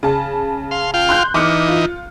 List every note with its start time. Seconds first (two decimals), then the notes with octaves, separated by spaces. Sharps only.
0.03 C#3 A5
0.71 F5 C6
0.94 F4 F5 G5
1.09 C6 F#6 G6
1.34 E3 D#4 D6 F6 C#7
1.68 F4